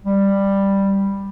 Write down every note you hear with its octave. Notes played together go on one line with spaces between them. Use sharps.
G3